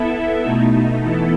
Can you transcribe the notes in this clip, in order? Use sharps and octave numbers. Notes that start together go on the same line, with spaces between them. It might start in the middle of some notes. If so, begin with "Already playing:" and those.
Already playing: B3 E4 A4 E5
B2 A3 D#4
E3 B3 E4 A4